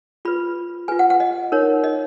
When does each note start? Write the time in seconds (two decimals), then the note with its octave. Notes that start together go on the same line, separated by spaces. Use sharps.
0.25 F4 B4 B5
0.88 F4 B4 G#5
0.99 F#5
1.10 F#5
1.20 D#5
1.52 D#4 A#4 C#5
1.84 D#5